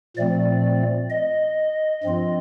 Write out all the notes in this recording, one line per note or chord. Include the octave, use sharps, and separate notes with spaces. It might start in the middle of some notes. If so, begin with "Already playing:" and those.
A#2 F3 A3 C4 D5
D#5
G2 F3 C4 F4